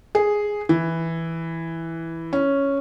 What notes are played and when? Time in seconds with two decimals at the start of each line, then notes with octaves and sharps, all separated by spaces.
0.15 G#4
0.69 E3
2.33 C#4